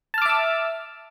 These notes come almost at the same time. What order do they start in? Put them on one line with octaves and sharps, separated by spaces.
A5 F6 D6 E5 E6